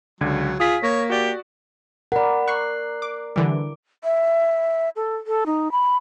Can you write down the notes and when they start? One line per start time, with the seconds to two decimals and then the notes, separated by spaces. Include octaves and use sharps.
0.21 C#2 D3 F#3 G#6
0.60 F4 G#4 D#6 B6
0.83 A#3 C#5 A#6
1.10 F#4 G4 D5
2.12 A#4 D5 F#5 B5
2.48 C#6 F#6 C7
3.02 D6
3.36 D3 E3 G3 D6
4.04 E5
4.96 A4
5.27 A4
5.46 D#4
5.72 B5